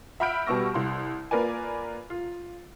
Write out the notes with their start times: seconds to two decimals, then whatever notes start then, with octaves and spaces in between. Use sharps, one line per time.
0.20 E5 F#5 B5 F6 G6 D7
0.47 B2 G3 B3 C#6 E6 A#6
0.74 C2 C6
1.31 A#3 F4 A#4 B4 D5 G#5
2.10 F4